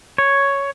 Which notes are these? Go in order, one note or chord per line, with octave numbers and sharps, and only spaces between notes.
C#5